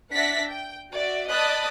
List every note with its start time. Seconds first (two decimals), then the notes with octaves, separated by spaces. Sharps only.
0.14 D4 D5 E5 F#5 A#6 B6
0.51 G5
0.93 F#4 D5 E5
1.31 D5 D#5 A5 B5 D#6 F#6